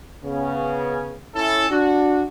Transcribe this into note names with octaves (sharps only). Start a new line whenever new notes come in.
C#3 B3 C#4
C#4 E4 A4
D4 F#4